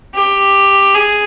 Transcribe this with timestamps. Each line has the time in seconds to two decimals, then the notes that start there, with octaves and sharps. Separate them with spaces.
0.15 G4
0.95 G#4